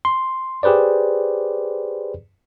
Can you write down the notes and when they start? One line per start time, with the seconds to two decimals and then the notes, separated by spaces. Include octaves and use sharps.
0.05 C6
0.63 G4 G#4 B4 C5 D5